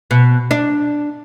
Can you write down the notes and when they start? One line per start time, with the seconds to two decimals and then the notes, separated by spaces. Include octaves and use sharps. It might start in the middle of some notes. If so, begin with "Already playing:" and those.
0.11 B2
0.51 D4